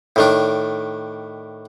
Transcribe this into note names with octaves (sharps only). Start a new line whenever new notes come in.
A2 D#3 D4